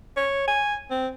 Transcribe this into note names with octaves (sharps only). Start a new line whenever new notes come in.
C#5
G#5
C4